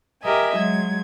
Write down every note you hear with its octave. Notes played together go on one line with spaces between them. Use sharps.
G4 A#4 D#5 E5 G#5
F#3 G#3 G#6